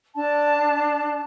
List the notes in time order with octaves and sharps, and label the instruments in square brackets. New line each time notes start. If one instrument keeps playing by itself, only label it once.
[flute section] D4 A5